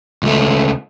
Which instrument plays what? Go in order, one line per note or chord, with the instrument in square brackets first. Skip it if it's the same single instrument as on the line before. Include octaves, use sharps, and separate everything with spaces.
[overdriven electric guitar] C#2 A3